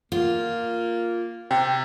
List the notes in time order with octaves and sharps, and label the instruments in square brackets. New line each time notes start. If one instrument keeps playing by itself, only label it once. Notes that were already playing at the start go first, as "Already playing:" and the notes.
[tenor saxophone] A#3 [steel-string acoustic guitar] F4
[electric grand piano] C3 [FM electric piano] G5